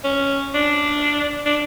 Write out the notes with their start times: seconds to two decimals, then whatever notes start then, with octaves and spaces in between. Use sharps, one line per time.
0.04 C#4
0.54 D4
1.46 D4